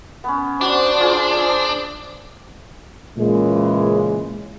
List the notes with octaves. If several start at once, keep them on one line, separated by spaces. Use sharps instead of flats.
B3 C#4
D4 F#4 C5 D5 D6
F4 G#4
D#5 E5
A#2 C#3 E3 G#3